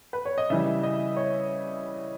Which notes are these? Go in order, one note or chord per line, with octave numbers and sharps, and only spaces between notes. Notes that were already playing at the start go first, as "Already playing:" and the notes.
B4
C#5
D#5
C#3 E3 G3 E5
D#5
C#5